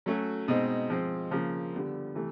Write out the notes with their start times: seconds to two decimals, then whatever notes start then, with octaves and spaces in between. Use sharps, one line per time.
0.06 F#3 A3 C#4 F#4
0.48 B2 G#3 C4 D#4
0.90 F3 G#3 C4
1.31 C#3 F3 A#3
1.73 D3 G3 B3
2.15 C3 E3 A3